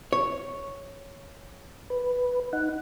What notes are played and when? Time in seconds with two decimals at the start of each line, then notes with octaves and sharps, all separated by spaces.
0.13 C#5
1.90 B4
2.53 D#4 F#5